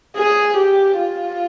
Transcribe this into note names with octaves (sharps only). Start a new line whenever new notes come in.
G#4
G4
F4